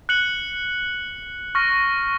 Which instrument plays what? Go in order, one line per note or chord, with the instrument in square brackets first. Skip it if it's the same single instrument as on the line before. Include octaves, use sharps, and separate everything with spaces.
[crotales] F#6 C#7 F#7
C#6 F6 A#6